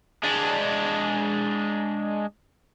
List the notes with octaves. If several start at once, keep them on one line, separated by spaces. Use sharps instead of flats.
G#3 D4